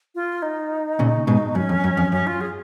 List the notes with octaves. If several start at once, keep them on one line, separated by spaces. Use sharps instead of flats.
F4
D#4
A#2 C#3
G#2 B2
F#2 C#4
F2
F#2
F2
F#2 C#4
F4
G#4